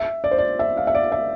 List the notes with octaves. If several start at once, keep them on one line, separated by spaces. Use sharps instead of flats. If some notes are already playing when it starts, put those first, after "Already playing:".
Already playing: E5
D5
C5
D5
E5
F5
E5
D5
E5